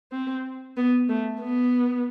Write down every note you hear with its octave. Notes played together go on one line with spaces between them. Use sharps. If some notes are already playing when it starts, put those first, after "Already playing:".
C4
B3
A3
B3